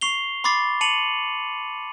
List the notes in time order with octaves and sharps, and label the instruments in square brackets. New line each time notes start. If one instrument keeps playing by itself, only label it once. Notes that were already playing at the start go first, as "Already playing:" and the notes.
[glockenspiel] C#6 C7 F7 G7
B5 C6 D6 A6 C7
A5 C#7 D#7 F7 F#7